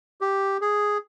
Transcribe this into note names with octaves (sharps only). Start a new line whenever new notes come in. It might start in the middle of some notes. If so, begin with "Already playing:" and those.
G4
G#4